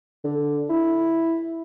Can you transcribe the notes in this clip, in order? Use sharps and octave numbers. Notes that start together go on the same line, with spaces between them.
D3
E4